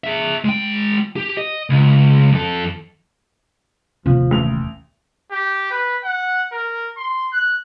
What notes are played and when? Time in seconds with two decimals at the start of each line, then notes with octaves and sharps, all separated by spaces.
0.04 G#4 E5
0.45 G#3 G5
1.16 G4
1.37 D#5
1.70 C#2
2.32 F2 A4
4.06 D#1 D#2 C3 F3 C4
4.31 A1 F7
5.31 G4
5.71 B4
6.04 F#5
6.52 A#4
6.97 C6
7.33 F#6